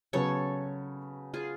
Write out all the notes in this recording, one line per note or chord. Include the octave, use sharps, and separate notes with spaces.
C#3 F#3 B3 A4 C#5
F4 G#4